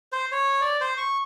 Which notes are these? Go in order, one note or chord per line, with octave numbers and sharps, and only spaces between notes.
C5
C#5
D5
C5
C#6